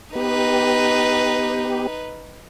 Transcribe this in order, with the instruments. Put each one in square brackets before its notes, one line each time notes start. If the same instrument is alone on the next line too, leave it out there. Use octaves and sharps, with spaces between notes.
[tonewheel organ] B3 G4 [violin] D#4 B4